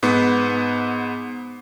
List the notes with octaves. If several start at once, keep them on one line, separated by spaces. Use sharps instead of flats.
G#2 B3